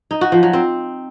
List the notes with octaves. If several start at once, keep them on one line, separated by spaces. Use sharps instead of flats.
D#4
F#4
F3
F#3
C4